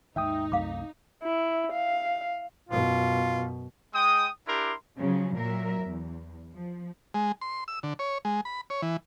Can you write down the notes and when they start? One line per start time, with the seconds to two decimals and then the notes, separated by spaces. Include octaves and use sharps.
0.16 D#2 G#2 D#3 D#4 E5 G5 D#6
0.52 C2 F#2 C3 A3 F5 D6
1.23 E4
1.72 F5
2.69 F#2 B2 F4
3.93 G#3 G5 D#6
4.47 D4 E4 G4 A#4 C6 D6
4.98 C#3 F3 F#3
5.36 A#2 F#3 A#4 E5
5.81 E2
6.53 F3
7.14 G#3
7.41 C6
7.68 E6
7.83 D3
7.99 C#5
8.25 G#3
8.45 B5
8.70 C#5
8.82 E3